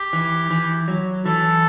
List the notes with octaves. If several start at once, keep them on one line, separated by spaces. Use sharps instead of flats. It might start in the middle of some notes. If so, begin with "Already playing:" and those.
Already playing: G4
E3
E3
F#3
E3 A4